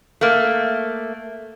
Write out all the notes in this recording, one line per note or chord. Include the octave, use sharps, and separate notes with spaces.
A3 A#3